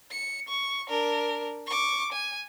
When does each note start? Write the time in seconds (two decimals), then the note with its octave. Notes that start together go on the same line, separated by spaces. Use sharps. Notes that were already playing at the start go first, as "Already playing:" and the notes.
0.11 C#7
0.48 C#6
0.89 D4 A#4
1.66 C#6 D6
2.12 G#5